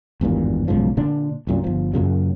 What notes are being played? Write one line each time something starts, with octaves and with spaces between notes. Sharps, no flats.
G#1 E2 G2 A#2
B1 G#2 C#3 F3
A#2 D3 D4
C2 F#2 A#2
G1 F3
F#2 A#2 C#3 F#3